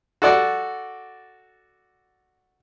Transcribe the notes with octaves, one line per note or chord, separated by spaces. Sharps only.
F#4 A4 D5 F#5